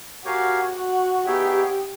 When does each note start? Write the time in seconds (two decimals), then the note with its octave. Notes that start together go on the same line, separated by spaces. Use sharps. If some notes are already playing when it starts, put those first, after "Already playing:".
0.25 F#4 G4 A#4 C#5 F5 G#5
0.75 F#4
1.27 B3 D#4 G4 G#4 C#5 E5